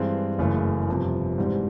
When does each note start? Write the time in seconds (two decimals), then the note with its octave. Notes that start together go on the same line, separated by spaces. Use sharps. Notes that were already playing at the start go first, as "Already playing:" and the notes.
Already playing: G2 E3 G#3 C4
0.39 F#1 F#2 C#3 E3 A3
0.89 G1 F2 C3
1.38 G#2 E3 G3 C4